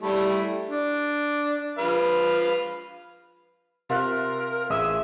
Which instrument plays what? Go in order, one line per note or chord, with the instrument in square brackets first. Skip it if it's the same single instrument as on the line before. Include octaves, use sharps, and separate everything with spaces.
[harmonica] G3 A3 E4
D4
F3 B4 F5
[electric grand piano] C3 E5 F#6 [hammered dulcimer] F4 [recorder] A#4
[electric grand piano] A1 D#6 [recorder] G#4 [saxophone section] E5